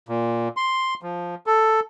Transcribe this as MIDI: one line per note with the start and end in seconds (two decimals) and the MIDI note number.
0.09 0.48 46
0.57 0.94 84
1.02 1.35 53
1.46 1.80 69